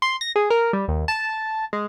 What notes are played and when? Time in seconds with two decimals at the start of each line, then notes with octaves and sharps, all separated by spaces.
0.02 C6
0.21 A#6
0.36 G#4
0.50 A#4
0.73 G3
0.88 D#2
1.08 A5
1.73 G#3